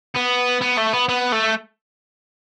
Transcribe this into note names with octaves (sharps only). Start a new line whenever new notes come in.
B3
B3
A3
B3
B3
A3